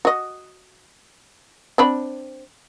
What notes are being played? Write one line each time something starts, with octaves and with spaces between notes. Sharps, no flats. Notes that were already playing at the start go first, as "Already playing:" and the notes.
F#4 D#5
C4 D4 B5